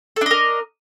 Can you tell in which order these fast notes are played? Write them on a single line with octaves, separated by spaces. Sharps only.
A4 D4 D#5 A#4